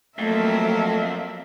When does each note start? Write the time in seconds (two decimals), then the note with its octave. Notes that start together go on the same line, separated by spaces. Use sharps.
0.19 F2 F#3 A3 A#3 A#4 E5